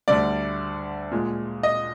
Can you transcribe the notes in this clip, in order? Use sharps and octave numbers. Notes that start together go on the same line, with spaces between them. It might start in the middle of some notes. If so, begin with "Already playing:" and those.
D2 D3 G3 D5
A#2 G#3
D#5